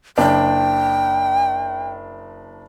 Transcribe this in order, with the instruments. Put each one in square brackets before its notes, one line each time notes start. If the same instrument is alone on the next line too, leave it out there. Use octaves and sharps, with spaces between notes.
[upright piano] F#1 D4 [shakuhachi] G5